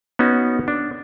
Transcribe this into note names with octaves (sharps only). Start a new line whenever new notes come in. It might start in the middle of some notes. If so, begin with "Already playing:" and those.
B3 C#4 D#4 F#4
D4